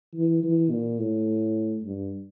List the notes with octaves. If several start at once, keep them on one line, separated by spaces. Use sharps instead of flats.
E3
E3
A#2
A2
G2